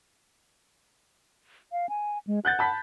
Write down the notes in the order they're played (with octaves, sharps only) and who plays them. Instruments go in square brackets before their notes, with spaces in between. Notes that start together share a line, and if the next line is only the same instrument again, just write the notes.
[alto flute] F5
G#5
G#3
[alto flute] F#5 [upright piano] F#6 G6 A6
[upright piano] A5 B5 B6